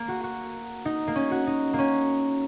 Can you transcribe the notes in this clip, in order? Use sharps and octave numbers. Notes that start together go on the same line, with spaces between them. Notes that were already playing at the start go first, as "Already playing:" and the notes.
Already playing: A#3
F#4
F#4
D#4
A#3
C#4
F#4
D#4
A#3
C#4